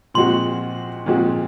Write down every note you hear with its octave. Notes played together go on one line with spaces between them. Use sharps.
A#2 F3 G#3 C4 F#4 C6
A#2 F3 G#3 C4 F#4